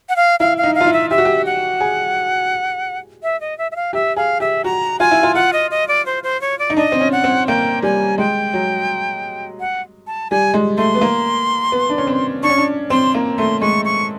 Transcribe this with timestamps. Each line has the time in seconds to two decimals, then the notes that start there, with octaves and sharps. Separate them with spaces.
0.09 F#5
0.16 F5
0.40 E4 F5
0.57 F5
0.63 D#4
0.75 F5
0.81 F4
0.87 E4
0.93 E5
1.10 G4 E5
1.18 F#4
1.25 G4
1.46 F#5
1.80 G#4
3.23 E5
3.41 D#5
3.58 E5
3.71 E5
3.76 F5
3.93 G4 E5
4.16 G#4 F5
4.40 G4 E5
4.64 F#4 A#5
5.00 F4 G#5
5.11 E4
5.23 F4
5.35 F4 F#5
5.53 D#5
5.71 D#5
5.88 D5
6.06 C5
6.23 C5
6.41 C#5
6.59 D5
6.70 D#4
6.76 D4 D#5
6.92 C4
7.01 C#4
7.12 F#5
7.24 C4
7.47 A#3 G5
7.82 G3 G#5
8.18 G#3 G5
8.54 F#3
9.60 F#5
10.07 A5
10.30 G3 G#5
10.54 G#3
10.78 A3 C6
10.95 B3
11.01 A#3
11.72 B3
11.90 D4
11.98 C#4
12.07 C4
12.43 D4 C#6
12.50 C#4
12.58 D4
12.90 C4 C6
13.14 A#3
13.38 A3 C6
13.61 G#3 C#6
13.85 C#6